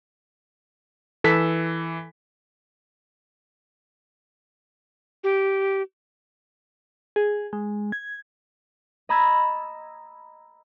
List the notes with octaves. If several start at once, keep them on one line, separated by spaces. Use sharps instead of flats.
E3 A4 B6
G4
G#4
G#3
G#6
D#5 A#5 B5 E6 G#6 A6